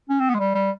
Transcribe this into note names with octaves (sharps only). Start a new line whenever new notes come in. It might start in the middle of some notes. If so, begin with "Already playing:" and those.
C#4
C4
B3
G#3
G3
G3